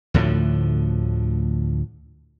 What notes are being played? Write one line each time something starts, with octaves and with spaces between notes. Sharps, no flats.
D2 A2 D3 F3